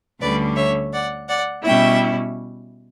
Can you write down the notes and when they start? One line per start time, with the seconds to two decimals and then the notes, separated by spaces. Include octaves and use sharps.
0.20 D2 D3 G3 C#4 B4 D5
0.56 C#5 E5
0.93 D5 F#5
1.28 D5 F#5
1.64 B2 G3 C#4 E4 E5 G5